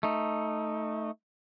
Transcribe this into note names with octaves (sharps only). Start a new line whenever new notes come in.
A3 D#4